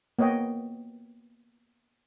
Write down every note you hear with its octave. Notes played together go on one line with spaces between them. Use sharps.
A#3 B3 C#5 D#5 G5